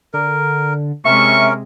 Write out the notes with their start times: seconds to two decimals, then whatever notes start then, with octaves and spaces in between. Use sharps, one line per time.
0.14 D3 A#4
1.05 C3 G#3 C#4 A#4 E5 C#6